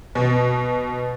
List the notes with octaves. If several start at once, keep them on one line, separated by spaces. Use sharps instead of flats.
B2